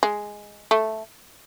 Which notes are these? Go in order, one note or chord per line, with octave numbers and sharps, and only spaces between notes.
G#3
A3